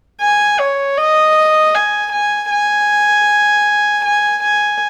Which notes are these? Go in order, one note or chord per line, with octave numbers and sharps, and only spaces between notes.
G#5
C#5
D#5
G#5
G#5
G#5
G#5
G#5